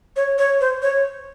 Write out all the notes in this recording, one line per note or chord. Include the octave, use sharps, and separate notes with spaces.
C#5
C#5
C5
C#5